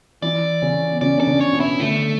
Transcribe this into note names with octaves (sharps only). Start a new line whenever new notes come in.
E3 E4 D5
C#3 C#4
B3
C#3 C#4 D5
D4 D5
C#3 C#4
C#5
B2 B3
E4
D3 A3